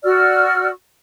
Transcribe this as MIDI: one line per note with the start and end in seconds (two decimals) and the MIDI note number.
0.04 0.69 66
0.04 0.69 74
0.04 0.69 88
0.04 0.69 89